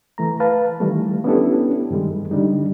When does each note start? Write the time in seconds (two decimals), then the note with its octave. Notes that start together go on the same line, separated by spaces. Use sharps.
0.18 E3 A3 A#5
0.40 B4 F5 A5
0.80 D#3 E3 G3 A3
1.24 B3 C#4 D4 E4 G4 A4
1.91 G2 D#3 G3 G#3
2.31 D3 G3 D4 D#4